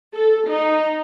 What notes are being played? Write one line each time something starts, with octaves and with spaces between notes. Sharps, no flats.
A4
D#4